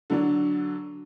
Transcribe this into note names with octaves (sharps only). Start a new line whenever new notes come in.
D3 F#3 D4